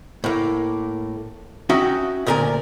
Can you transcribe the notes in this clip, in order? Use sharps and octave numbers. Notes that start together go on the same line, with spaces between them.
A2 A#3
C#4 D#4 F#4 E5 G5
D2 A#2 A#4 D5 G#5